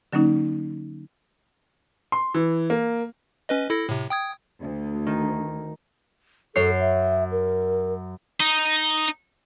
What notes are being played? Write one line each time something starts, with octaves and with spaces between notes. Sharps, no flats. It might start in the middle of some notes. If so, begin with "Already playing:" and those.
D3 F#3 A#3 C#4 D#4
C6
E3
A#3
C#4 B4 D#5
E4 A4 A#6
A2 C3
G5 D#6 G#6
D2
D#3
F#2 A4 C#5 C7
E5
A#4
D#4